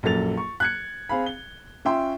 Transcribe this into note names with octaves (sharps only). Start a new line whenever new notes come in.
A#1 F#2 A#3 A4 A6 F7
C#6
F#6 G#6 C#7
C4 G#4 F5 B5
G7
C#4 F4 E5 G5 C6